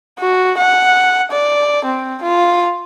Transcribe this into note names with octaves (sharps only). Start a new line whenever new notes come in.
F#4
F#5
D5
C4
F4